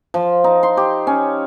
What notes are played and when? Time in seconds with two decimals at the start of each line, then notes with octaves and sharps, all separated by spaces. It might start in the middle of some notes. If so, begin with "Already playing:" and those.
0.14 F3
0.44 D#4
0.63 C6
0.77 G4
1.07 C#4